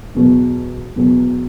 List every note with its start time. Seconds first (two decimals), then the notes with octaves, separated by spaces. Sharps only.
0.15 E2 B2 F#3
0.96 E2 B2 F#3